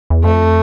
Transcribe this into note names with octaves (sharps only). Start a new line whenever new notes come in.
E2
F2 A3